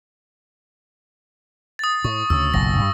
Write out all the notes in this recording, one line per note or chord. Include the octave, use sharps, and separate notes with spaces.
D#6 A6
A2 C#6
D2 C#3 E6
F#1 B1 A#2 A#6
G2 G3